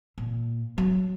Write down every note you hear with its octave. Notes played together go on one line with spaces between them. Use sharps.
A#2
F#3